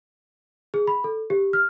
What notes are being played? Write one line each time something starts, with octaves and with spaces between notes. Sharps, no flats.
G#4
B5
A4
G4
F6